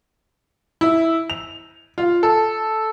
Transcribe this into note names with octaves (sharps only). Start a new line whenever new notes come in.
E4
F7
F4
A4